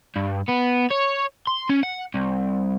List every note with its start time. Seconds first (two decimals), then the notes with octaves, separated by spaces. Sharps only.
0.16 G2
0.48 B3
0.91 C#5
1.47 C6
1.69 C#4
1.83 F#5
2.14 C2